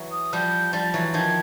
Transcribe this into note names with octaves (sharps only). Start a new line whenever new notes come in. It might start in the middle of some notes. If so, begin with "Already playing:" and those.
Already playing: E3 F#3
D#6
F3 G3 G6
F3 G3 A6
E3 F#3 A6
D#3 F3 G#6